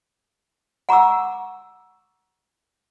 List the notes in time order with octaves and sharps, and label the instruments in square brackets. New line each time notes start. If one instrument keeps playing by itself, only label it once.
[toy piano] F#5 A#5 C#6 D6 E6